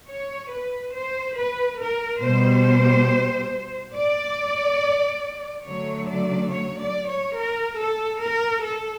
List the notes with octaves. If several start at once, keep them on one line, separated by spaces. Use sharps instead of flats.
C#5
B4
C5
B4
A#4
B2 G3 C5
D5
D3 F#3 A3 C#5
D5
C#5
D5
C#5
A#4
A4
A#4
A4